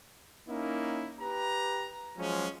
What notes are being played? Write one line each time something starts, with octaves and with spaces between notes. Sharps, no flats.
A#3 C#4 D#4 E4
G4 B4 A#5
F3 F#3 G#3 C#4